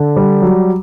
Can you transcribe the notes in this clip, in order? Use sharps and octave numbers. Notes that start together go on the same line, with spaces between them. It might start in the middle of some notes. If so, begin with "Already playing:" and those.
Already playing: D3
G3
F#3